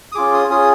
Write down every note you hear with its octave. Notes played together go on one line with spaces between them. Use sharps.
D#6
C#4 F4 G#4 D6
D#6
C#4 F4 G#4 D#6